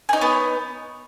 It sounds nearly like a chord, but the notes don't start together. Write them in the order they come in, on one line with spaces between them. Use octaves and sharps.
G#4 D#4 C#5 B3